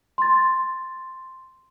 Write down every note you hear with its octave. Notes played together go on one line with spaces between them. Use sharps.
C6 A6